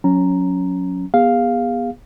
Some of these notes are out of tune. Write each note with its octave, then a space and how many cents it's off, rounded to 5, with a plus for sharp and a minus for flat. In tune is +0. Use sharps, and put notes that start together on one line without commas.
F#3 -25 C#4 +0 A#5 -5
B3 -25 G#4 -35 F5 +0